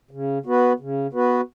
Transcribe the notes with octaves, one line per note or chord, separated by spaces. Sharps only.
C#3
B3 F#4 B4
C#3
B3 F#4 B4